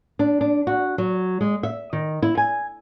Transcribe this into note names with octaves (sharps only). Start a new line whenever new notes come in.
D4
D4
F#4
F#3
G#3
E5
D#3
E4
G#5